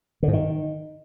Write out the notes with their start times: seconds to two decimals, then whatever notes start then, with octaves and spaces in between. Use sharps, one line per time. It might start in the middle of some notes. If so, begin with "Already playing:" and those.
0.23 D3
0.28 G#2
0.33 D#3